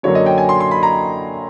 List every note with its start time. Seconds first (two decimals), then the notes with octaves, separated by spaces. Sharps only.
0.03 F#2 D3 F#3 A#3 C#5
0.15 D#5
0.26 G5
0.38 G#5
0.49 C6
0.61 C6
0.71 B5
0.83 A#5